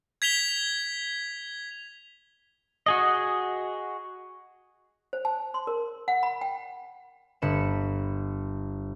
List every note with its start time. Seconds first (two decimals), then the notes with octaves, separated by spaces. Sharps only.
0.22 G#6 B6 F7 G7
2.86 F#4 G#4 D#5
5.13 C5
5.25 A5
5.54 C6
5.67 A#4
6.08 F#5
6.23 B5
6.41 G5
7.42 G1 B5 C#7 E7